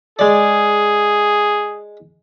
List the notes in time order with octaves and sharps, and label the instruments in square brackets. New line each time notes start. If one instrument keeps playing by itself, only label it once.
[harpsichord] G#3 D5 [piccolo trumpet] G#4